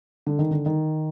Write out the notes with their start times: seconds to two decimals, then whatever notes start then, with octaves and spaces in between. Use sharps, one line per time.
0.26 D3
0.39 D#3
0.51 D3
0.66 D#3